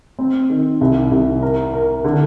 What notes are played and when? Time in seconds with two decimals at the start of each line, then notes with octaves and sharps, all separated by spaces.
0.19 C4
0.50 D#3
0.81 C2
1.12 C2
1.43 A#4
1.73 A#4
2.04 D3